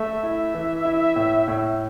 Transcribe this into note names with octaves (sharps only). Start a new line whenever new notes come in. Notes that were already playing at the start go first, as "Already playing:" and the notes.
Already playing: A3 E5
E4
E3
E4
A2
A2